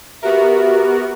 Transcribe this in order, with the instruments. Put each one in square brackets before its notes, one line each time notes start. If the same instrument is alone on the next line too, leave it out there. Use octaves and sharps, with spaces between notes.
[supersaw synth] B3 F#4 A#4 [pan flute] G4 [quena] E5